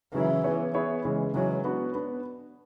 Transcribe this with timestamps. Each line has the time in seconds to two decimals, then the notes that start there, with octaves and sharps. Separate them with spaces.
0.13 C#3 E3 F#3 C#4 E4
0.44 B3 E4 G#4 C#5
0.74 B3 E4 G#4 C#5
1.05 C#3 E3 G#3 C#4
1.34 C#3 E3 F#3 G#3 C#4
1.65 B3 D4 F#4
1.95 B3 D4